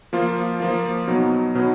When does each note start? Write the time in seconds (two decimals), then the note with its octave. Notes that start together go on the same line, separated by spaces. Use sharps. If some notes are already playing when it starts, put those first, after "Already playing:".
0.13 F3 A#3 F4
0.60 F3 A#3 F4
1.08 B2 F#3 B3 D#4
1.55 B2 F#3 B3 D#4